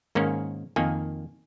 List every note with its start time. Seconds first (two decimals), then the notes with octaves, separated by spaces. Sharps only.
0.15 G#2 D#3 A#3 C#4
0.76 F2 D#3 A#3 G#5